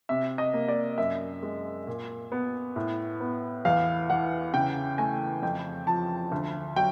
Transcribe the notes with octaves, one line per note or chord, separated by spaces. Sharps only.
C3 E5
D#5
A#3
D5
F#2 E5
G#3
A#2
B3
A2
B3
E2 F5
E3 F#5
C#3 G5
A3 G#5
F2 G5
F3 A5
D2
F#3 G5